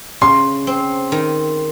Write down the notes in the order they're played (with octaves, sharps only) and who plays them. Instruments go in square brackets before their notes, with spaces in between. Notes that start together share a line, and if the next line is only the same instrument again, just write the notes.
[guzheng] C#3 [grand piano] C6
[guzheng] C4
D#3